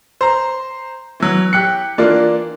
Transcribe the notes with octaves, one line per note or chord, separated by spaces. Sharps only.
C5 A#5
E3 F#3
G4 F#6 C#7
E3 A#3 D4 F4